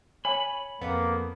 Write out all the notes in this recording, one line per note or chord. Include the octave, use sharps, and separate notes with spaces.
C#5 G#5 B5
F2 A#3 B3